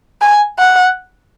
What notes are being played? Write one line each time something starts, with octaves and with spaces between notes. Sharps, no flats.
G#5
F#5